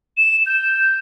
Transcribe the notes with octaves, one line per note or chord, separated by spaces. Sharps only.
E7
G6